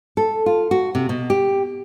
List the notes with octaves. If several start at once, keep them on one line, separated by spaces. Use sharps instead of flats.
A4
F4
F#4
C3
B2
G4